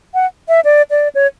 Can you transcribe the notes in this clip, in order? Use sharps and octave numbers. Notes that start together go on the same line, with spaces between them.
F#5
E5
D5
D5
C#5